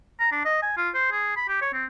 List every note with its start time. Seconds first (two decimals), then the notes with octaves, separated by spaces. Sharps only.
0.20 A#5
0.32 D4
0.45 D#5
0.62 G#5
0.77 F4
0.94 C5
1.12 G#4
1.37 B5
1.49 G4
1.61 C#5
1.73 C4